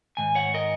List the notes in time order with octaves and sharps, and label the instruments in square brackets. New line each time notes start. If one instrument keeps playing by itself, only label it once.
[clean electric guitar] G#2 D#3 G#5
C#5 F#5
A#4 D#5